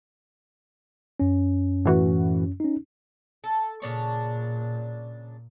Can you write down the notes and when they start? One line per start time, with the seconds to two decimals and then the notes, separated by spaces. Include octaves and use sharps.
1.20 F#2 C#4
1.85 A2 E3 F#4
2.60 C#4 D#4
3.44 A4
3.82 A#2 C#3 D4 C#5